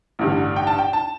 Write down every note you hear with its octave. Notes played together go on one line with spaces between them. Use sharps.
A1 G2 D3
G5
A5
G5
A5